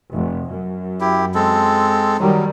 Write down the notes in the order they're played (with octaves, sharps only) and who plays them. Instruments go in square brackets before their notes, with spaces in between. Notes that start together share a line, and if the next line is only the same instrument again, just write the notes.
[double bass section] F1
F#2
[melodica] E4 G4
G#3 C4 A4
[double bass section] D#3 G3 [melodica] F#3